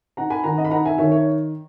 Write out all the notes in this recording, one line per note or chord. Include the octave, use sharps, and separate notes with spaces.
D#4 F#5 A#5
G#5 B5
D#3 F#5 A#5
D#5 F#5
B5
D#4 F#5 A#5
E5 G#5
D#3 C#5 E5
C#5 E5